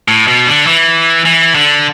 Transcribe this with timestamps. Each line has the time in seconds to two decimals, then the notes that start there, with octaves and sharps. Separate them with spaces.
0.08 A2
0.27 B2
0.47 D3
0.66 E3
1.25 E3
1.55 D3